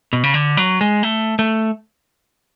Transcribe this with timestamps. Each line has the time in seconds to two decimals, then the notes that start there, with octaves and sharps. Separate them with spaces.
0.13 B2
0.24 C#3
0.34 D3
0.57 F#3
0.81 G#3
1.03 A3
1.39 A3